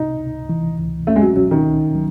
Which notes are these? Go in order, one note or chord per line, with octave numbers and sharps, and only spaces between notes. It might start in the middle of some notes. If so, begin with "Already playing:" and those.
Already playing: C2 C3 D#4
C#2
E3
C#2
A3 C#4
G#3
F#3
F#3 C#4
D#3
C2
F#3